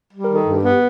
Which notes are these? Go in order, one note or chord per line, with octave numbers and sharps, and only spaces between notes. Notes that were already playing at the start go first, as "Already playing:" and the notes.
G3
A#4
D#3
A4
G2
G4
B3